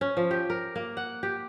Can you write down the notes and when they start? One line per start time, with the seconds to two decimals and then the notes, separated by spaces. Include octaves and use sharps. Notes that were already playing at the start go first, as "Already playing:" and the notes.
0.01 C#4
0.17 F3
0.31 G4
0.50 A#4
0.76 A#3
0.97 F#5
1.23 G4